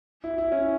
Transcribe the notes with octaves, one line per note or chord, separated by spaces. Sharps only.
E4
E4
C#4